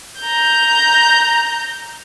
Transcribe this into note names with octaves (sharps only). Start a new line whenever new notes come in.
A#5 G6